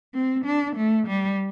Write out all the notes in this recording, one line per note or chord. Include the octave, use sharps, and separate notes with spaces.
C4
D4
A3
G3